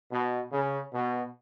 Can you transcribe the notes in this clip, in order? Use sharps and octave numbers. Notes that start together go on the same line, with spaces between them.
B2
C#3
B2